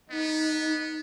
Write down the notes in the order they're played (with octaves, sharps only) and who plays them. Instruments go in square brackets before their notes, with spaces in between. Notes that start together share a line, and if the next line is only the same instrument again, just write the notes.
[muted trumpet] B3 [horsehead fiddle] D#4